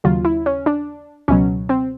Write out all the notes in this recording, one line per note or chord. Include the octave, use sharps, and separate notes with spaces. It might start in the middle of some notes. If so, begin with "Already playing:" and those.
D#2 C#3 F#3 F4
E4
C#4
D4
C#2 B2 F#3 C#4
C4